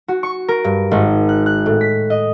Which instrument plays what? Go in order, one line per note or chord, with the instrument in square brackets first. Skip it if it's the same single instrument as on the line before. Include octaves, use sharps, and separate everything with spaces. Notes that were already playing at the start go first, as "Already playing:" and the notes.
[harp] F#4
C#6
A#4
G2
G#1
F#6
F#6
A2
B6
D#5